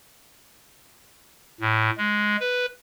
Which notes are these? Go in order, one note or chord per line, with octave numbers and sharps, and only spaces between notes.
A2
G#3
B4